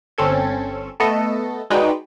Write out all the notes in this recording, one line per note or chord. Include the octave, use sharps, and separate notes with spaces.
G1 C4 C#4 A4 G#6
A3 B3 A4 D#5
G#3 D#4 F#4 B4 D5 G5